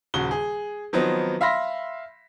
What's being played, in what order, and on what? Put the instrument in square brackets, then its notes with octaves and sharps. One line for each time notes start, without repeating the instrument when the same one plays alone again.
[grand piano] D#1 C#3 F#4 G7
G#4
D#3 F3 F#3 B3 C4 D#4
E5 F5 B5 C6 A#6 B6